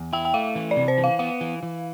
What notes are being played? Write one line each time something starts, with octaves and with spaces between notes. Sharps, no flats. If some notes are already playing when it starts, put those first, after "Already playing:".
Already playing: E2
E4 G5
G5
A3 F5
E3
D5
C3
C5
E3
F5
B3 F5
E3
E3